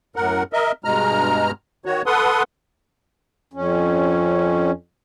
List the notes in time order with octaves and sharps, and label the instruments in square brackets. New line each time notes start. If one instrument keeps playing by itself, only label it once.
[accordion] F#2 A2 A#4 F#5
A#4 D#5 E5
G2 B2 G#3 A#5 F6
D#3 F#4 C#5
A4 B4 F#5 C6 D#6
[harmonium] F2 C#4